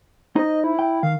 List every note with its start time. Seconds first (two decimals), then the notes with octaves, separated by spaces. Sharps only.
0.36 D#4 C5 D#5
0.64 E4
0.79 G5
1.03 D#3 F5